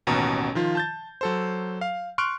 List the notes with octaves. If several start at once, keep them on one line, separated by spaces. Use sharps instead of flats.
A1 D#2 B2 C#4 A#5
D#3 F3 F4
A5 G6 A6
F#3 A4 C5
F5
C6 C#6 F6 F#6 D7